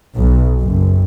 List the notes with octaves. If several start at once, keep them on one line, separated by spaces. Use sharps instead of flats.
B1
F#1